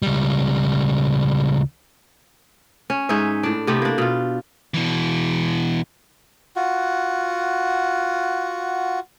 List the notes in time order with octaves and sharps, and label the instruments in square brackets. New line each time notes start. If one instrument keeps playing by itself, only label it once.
[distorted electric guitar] C#2 G3
[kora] C#4
G#2 D#4 C#5 E5
A2 D4
C3 A3 B3 G4
A#3 D4
B2 F4
[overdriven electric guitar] B2 E3
[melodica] F4 F#4 F#5